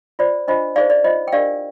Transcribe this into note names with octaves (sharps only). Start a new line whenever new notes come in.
F4 C5 D5
D4 F4 C5 D#5
D#4 G#4 C5 D5 F5
D5
F4 C5 D#5
G5
D4 G4 A#4 D5 F5